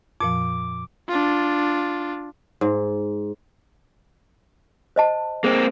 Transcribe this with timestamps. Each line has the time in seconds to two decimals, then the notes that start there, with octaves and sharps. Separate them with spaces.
0.20 F2 A#2 F3 D6
1.09 D4 F4
2.61 G#2
4.96 C5 D#5 A5
5.44 A#3 C4 G#4 C5